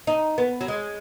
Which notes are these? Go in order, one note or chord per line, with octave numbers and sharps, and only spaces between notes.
D#4
B3
F#3
G#3